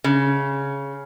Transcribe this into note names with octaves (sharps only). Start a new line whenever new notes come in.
C#3